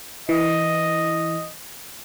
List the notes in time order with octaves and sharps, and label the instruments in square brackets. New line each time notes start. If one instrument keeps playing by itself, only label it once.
[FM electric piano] E3 [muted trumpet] D#5